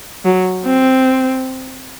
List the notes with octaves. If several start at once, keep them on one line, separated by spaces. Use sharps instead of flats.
F#3
C4